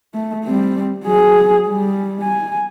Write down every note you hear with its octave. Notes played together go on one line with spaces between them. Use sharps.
A3
G3 C4
F#3 G#4
G3
G#5